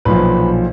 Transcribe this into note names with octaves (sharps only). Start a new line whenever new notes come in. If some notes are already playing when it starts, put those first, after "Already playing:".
B1 A#2 F3 B4